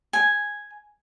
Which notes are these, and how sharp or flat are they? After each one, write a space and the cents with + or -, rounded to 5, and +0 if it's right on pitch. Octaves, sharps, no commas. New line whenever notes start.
G#5 +0